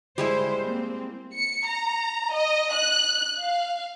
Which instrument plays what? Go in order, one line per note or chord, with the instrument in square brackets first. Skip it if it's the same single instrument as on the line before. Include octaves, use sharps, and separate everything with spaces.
[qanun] G3 G#3 E4 [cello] C5
[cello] A#3 C4
[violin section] C#7
A#5
D#5
F#6
F5